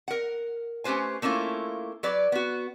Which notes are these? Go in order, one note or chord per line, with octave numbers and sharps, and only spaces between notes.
A#4 F#5
A3 C#4 G4 B4 C5 G#5
A3 A#3 C#4 E4 F4
F#3 B4 D5
B3 F#4